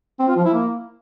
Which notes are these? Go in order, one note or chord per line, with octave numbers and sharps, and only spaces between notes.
C4
F4
F3
E4
A#3